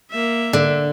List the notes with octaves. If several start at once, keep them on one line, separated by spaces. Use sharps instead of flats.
A#3 E5
D3